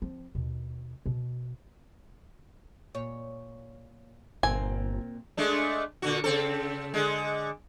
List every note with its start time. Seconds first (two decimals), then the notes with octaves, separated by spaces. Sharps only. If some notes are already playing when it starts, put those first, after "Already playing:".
0.02 F3 C4
0.35 D#2 B2
1.06 B2
2.94 A#2 C#5
4.43 G1 A#2 A#3 C4 G#5
5.37 G#3 A3 D4
6.02 A#2 D3 F#4
6.24 C#3 C4 A4
6.94 D3 G#3